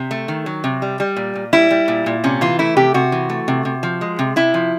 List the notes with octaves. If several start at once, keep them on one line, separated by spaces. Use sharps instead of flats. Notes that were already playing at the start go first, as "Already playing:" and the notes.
Already playing: C3
A3
D#3
F#3
C3
G3
G3
A#2
A#2
G3 E4
G3
A#2
A#2
C3 C#4
E3 F4
A3 E4
C3 G4
C3 F#4
E3
A3
C3
C3
F3
G#3
C3
C3 E4
F3